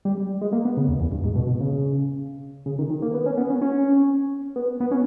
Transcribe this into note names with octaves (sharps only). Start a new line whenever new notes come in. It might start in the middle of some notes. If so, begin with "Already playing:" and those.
G3
G#3
A#3
B3
C#3
E2
E2
G2
G#2
B2
B2
C#3
C#3
D#3
D#3
A#3
B3
C#4
B3
C#4
C#4
B3
B3
C#4